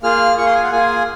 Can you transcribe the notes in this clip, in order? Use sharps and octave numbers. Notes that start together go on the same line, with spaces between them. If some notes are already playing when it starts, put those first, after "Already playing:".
A#3 F4 G#4 F6
A#3 F4 G#4 C#6
C6
G#5
F#5
A#3 F4 G#4 G#5